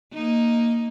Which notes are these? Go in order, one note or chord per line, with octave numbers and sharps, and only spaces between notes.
A#3 D#4